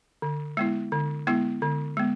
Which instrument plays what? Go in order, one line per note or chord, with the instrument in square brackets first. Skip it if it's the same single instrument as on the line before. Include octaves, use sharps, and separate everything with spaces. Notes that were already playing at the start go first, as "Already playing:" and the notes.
[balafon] D3
G#3 B3 E4
D3
G#3 B3 E4
D3
G#3 B3